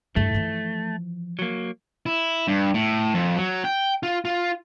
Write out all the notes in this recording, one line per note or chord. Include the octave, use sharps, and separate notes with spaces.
E2 G2 A3
E3 F3
F#3 A#3
E4
G2
A2
F2
F#3
G5
F4
F4